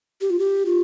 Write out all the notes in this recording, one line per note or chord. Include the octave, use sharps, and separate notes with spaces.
G4
F4
G4
F4